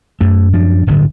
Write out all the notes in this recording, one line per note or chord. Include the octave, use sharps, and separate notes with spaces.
F#2 A3
F#2 F3 D4
D1 G1 A2 D3